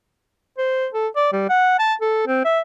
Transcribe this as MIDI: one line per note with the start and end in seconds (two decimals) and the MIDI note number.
0.58 0.88 72
0.94 1.08 69
1.16 1.29 74
1.33 1.47 55
1.50 1.76 78
1.79 1.94 81
2.01 2.25 69
2.27 2.44 60
2.45 2.60 76